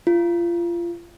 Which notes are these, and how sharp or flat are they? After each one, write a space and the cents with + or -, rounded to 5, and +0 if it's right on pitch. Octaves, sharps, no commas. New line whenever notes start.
F4 -30